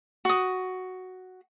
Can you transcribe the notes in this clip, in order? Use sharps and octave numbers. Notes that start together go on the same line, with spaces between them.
F#4 D#6